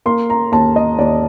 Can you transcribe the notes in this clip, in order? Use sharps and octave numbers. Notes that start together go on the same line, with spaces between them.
A#3 C6
A#5
D#2 A5
D#5
D#2 D5